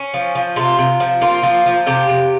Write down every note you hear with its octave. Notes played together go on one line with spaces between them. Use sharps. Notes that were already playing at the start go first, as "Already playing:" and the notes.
Already playing: C#4
F3
F3
C3 F4
C3
F3
A#3 F4
F3
F3
C3 G4
C3